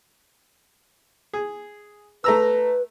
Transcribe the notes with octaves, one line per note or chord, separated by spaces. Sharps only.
G#4
A3 B4 A#5 E6